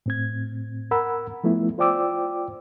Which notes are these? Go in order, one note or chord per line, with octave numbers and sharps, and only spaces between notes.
A2 C4 G#6
A#4 F#5 A#5 B5 E6
F3 A3 B3 E4
F4 C5 D5 G5 D6 E6